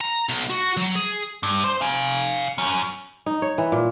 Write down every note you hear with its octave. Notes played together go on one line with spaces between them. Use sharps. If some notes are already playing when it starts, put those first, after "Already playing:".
A#5
B1
F#4
F#3
G#4
G2
C5
F5 G#5
F#2 C#4
D#4
C#5
E3
A#2